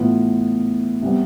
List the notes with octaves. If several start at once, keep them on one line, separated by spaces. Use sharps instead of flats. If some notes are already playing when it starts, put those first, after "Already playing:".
Already playing: A2 E3 B3 F4
C3 G3 B3